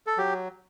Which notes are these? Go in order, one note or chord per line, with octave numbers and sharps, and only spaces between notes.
A4
F#3 G4